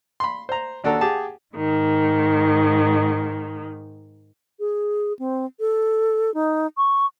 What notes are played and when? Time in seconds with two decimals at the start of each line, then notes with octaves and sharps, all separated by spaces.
0.20 B5 C6
0.49 C5 A#5
0.84 D#2 D4 F#4 A4 A#5
1.01 G4 G#4 F#5 A5
1.54 G#2 D#3
4.60 G#4
5.19 C4
5.60 A4
6.34 D#4
6.77 C#6